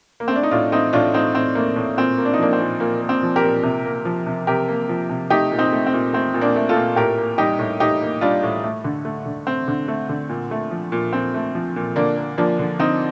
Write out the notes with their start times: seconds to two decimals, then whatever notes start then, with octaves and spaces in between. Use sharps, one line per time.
0.20 A#3
0.28 A3 C4
0.36 D4
0.43 D#4
0.51 A2 D4 F4
0.72 A3 C4 D#4
0.93 A2 D4 F4
1.14 A3 C4 D#4
1.35 A2 C4
1.55 A3 A#3
1.76 A2
1.97 A#2 C4
2.18 A#3
2.25 D4
2.34 D#4
2.39 F3 A#3 D4
2.53 C4
2.60 A#2
2.80 A#2 A#3
3.01 A#3
3.09 C4
3.23 F3
3.36 G4 A#4
3.43 A#2
3.63 C3
3.85 A#3
4.05 F3
4.27 C3
4.47 C3 G4 A#4
4.68 A#3
4.89 F3
5.10 C3
5.30 A3 D#4 G4
5.52 A#2
5.59 C4 D#4
5.73 A3
5.86 C4
5.93 A#2
6.13 A3 C4
6.34 A#2
6.41 A#3 D4
6.56 A3
6.69 F4 A4
6.76 A#2
6.96 A2 G4 A#4
7.18 A#3
7.38 G3 D#4 G4
7.59 A2
7.80 A2 D#4 G4
8.02 A#3
8.21 G3 D4 F4
8.43 A2
8.63 A3
8.84 D3
9.05 A3
9.26 D3
9.47 A3 C4
9.68 D3
9.88 A3
10.09 D3
10.29 A#2
10.51 A3
10.71 F3
10.92 A#2
11.13 A#2 C4
11.34 A3
11.55 F3
11.76 A#2
11.96 D3 A#3 D4
12.17 A#3
12.38 F3 A#3 D4
12.59 D3
12.79 D3 C4 D#4